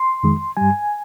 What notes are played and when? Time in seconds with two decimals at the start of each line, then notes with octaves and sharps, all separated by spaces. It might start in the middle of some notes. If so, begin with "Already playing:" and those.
Already playing: C6
0.23 F2 D#3 G#3
0.57 G2 G3 G#5